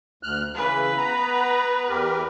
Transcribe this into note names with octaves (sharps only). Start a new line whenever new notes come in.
D2 F6 F#6
C#3 E3 B4
B3 A#5
E2 G4 A#4